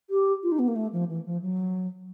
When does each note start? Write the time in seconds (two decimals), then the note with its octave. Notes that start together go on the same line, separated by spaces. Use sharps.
0.10 G4
0.43 F4
0.52 D#4
0.59 B3
0.68 A#3
0.76 A3
0.93 F3
1.09 E3
1.26 F3
1.42 F#3